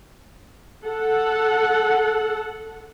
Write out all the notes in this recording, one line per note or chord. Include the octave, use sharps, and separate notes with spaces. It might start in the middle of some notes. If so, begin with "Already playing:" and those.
A4 F#5